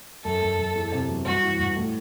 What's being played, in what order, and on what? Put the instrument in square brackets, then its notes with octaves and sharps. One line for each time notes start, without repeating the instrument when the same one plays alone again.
[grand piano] F#2 [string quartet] A4
[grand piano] F#2
F#2
E2
C3
F#3
[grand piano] G2 [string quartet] F#4
[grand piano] E3
G2
A2